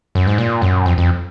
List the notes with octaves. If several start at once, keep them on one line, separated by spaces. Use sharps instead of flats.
F#2
G#2
A#2
F#2
F2
F2